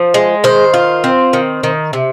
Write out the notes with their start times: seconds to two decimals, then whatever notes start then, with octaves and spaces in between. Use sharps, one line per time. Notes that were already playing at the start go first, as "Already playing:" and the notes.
Already playing: F3
0.14 G#3
0.44 D#3 C5
0.74 F4
1.04 C4
1.33 D#3
1.63 D#3
1.93 C3